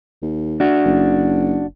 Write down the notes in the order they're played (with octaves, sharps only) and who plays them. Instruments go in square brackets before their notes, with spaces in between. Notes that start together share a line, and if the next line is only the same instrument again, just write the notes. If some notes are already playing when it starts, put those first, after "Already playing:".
[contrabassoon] D#2
[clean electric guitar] D4 F#4
[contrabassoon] F#1